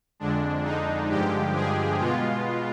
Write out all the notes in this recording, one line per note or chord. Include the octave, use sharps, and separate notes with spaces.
F2 D3 G#3 D4
D#4
G2 D3 F3 G#3 G4
G#4
B2 G#3 B3 F4